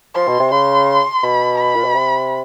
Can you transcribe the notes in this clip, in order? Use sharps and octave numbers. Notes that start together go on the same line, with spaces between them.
F3 C6
B2
C3
C#3 C6
B2 B5
B5
A#2
B2
C3